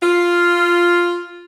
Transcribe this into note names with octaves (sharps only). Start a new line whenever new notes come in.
F4